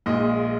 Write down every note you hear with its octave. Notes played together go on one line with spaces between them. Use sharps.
A#1 A#2 G#3 D#5